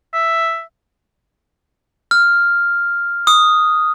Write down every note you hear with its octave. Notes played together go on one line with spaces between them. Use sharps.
E5
F6
D#6